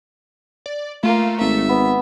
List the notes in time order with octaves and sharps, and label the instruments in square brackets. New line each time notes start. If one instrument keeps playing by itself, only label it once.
[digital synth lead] D5
[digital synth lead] A3 [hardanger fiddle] A#3 F4
[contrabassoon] G#1 [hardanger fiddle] E5
[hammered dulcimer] B3